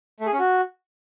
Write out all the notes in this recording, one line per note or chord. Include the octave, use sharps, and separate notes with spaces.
A3
G#4
C#4
F#4